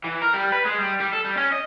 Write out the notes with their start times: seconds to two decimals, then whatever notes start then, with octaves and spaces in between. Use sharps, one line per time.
0.04 E3
0.22 A#4
0.34 G3
0.52 B4
0.66 G#3
0.79 G3
1.01 G3
1.13 A4
1.25 G3
1.37 C#4
1.52 D#5